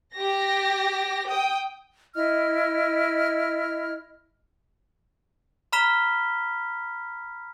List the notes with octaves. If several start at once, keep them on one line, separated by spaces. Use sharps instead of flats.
G4 A#6
G5 D#6
E4 D#5 F6
A#5 B5 F6 B6 E7 G7